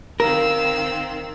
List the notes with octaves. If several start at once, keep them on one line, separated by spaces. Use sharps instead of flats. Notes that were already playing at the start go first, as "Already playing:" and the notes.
D#3 C4 A#4 F5 E6